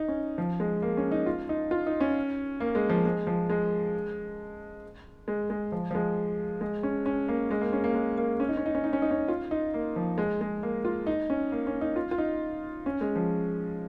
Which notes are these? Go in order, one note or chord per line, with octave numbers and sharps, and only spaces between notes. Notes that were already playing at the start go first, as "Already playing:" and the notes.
Already playing: D#4
C#4
F3
G#3
A#3
C#4
D#4
F4
D#4
F4
D#4
C#4
A#3
G#3
F3
G#3
F3
G#3
G#3
G#3
F3
F3
G#3
G#3
C#4
C#4
A#3
G#3
A#3
C#4
A#3
G#3
A#3
C#4
D#4
C#4
D#4
C#4
D#4
C#4
D#4
C#4
F4
D#4
A#3
F3
G#3
G#3
A#3
F4
D#4
C#4
A#3
C#4
D#4
F4
F4
D#4
C#4
G#3
F3